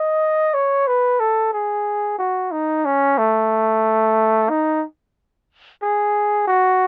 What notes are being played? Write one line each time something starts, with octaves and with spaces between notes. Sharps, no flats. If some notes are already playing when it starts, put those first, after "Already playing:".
Already playing: D#5
C#5
B4
A4
G#4
F#4
D#4
C#4
A3
D#4
G#4
F#4